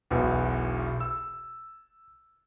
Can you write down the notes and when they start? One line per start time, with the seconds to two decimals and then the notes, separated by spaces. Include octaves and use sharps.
0.11 E1 B1 E2
1.00 E6